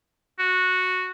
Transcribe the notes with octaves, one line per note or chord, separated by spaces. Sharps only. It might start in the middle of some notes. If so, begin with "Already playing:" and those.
F#4